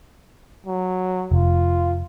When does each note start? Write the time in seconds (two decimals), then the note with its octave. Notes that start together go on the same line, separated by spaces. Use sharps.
0.66 F#3
1.31 F1 F4